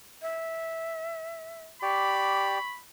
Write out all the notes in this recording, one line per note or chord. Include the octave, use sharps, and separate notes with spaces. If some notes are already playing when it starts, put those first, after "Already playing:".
E5
G4 D5 B5 C#6